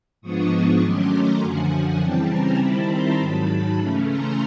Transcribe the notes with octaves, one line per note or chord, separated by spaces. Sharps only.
G#2 F3 G#3 B3 D4 C#6 D#6
D#3 F#3 A3 C#4 C6 D6
A#5 C6
F#2 D3 F3 F#5 G#5
C#3 E3 G3 C4 G5 A5
G#5 A#5
D#3 G3 C4 E4 A5 B5
A#5 C6
G#2 D#3 F#3 A5 B5
C#3 E3 A3 C#4
A#5 C6